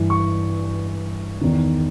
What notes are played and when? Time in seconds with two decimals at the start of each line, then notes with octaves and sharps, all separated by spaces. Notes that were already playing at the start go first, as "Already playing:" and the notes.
Already playing: G2 E3
0.10 C#6
1.41 E2 D#3